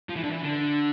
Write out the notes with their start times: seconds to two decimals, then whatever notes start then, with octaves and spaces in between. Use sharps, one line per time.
0.09 F3
0.16 E3
0.24 D3
0.31 E3
0.44 D3